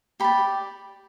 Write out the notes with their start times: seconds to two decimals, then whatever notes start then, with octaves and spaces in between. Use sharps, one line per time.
0.20 G4 D5 B5